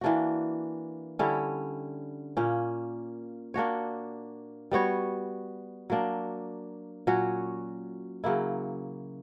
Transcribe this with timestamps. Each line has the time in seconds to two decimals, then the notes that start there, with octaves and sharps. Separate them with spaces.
0.01 E3 A#3 D4 F#4
1.19 D3 G3 C#4 E4
2.37 A#2 A#3 C#4
3.54 A#3 D4 F#4 C#5
4.71 G3 B3 F#4 C#5
5.90 F#3 A#3 D4
7.07 A#2 F#3 C#4 F#4
8.24 C#3 F#3 A#3 E4